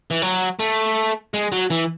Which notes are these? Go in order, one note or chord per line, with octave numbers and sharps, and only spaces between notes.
E3
F#3
A3
G#3
F#3
E3